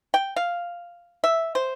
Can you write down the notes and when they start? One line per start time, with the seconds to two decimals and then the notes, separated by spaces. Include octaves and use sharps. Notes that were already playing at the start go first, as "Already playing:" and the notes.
0.14 G5
0.36 F5
1.24 E5
1.55 C5